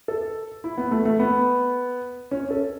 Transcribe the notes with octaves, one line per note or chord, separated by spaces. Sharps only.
A4
E4
B3
A3
A3
B3
C#4
A4